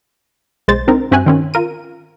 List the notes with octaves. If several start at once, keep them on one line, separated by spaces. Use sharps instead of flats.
B1 G#3 C5 A6
D3 C4 D#4 A#4
G2 C4 F#4 E5 G#5 F#6
D#3 C4 C#4
F4 A#4 D#7